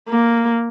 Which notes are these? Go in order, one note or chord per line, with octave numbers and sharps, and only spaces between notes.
A#3